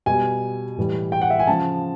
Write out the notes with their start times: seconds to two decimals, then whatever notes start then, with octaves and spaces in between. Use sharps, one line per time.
0.06 B2 G3 G#5
0.78 A2 E3 G3
1.12 G5
1.22 F#5
1.30 E5
1.39 G#5
1.47 C#3 F3 A5